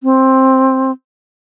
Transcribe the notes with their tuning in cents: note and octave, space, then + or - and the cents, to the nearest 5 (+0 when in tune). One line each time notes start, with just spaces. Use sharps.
C4 +10